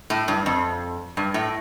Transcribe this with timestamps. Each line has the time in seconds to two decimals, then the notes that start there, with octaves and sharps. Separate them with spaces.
0.10 A2
0.28 G2
0.46 F2
1.17 G2
1.34 A2